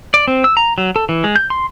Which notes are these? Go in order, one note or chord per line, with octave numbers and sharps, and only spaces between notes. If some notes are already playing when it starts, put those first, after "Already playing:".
D5
C4
E6
A#5
F#3
A4
E3
G#3
G6
C6